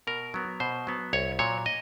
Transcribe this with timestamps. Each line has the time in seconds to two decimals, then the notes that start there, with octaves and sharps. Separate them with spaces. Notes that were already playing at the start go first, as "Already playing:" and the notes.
0.07 B2 A#4
0.34 F#3 B3
0.60 B2 C5
0.87 F#3 B3
1.13 C2 C#5
1.39 A#2 F#3 C#5
1.66 D#5